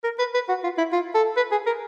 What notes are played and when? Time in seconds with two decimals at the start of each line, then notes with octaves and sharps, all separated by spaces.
0.04 A#4
0.19 B4
0.34 B4
0.49 F#4
0.64 F4
0.78 E4
0.93 F4
1.15 A4
1.37 B4
1.52 G#4
1.67 A#4